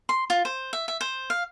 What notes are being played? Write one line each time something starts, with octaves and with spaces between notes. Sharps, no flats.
C6
F4
C5
E5
E5
C5
F5